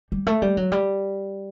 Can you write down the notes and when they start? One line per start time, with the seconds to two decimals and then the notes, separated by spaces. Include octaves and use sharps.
0.12 G3
0.27 A3
0.42 G3
0.57 F#3
0.72 G3